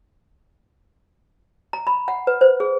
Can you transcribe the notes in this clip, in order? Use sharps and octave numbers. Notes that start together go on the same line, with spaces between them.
A#5
B5
F#5
B4
C5
G#4